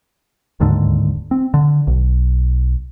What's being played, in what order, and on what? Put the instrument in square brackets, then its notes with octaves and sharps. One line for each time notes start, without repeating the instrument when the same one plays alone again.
[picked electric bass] D1 D#2 G#2 D3
C4
D3
B1